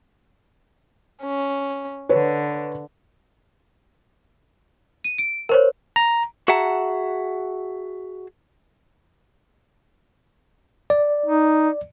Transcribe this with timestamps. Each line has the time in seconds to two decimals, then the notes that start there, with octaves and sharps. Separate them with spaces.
1.21 C#4
2.09 D3 B4 C#5
5.04 D#7
5.18 D7
5.49 A#4 C5 C#5
5.96 A#5
6.48 F#4 G#4 E5 F#5 A5 A#5
10.90 D5
11.26 D#4